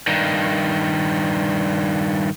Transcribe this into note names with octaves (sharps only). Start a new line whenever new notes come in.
G2 D#3